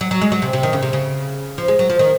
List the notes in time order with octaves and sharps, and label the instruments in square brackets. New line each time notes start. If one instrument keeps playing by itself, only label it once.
[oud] F#3
F#3
G#3
F#3
C3
C3
D#3
C#3
C3
C#3
F3
G#3
F#3
F3
D#3